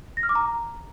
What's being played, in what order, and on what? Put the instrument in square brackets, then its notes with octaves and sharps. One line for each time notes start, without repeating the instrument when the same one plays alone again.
[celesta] A#6
F6
D6
A#5